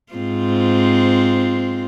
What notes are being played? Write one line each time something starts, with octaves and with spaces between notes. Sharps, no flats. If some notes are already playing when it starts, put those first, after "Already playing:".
G#2 C4 F4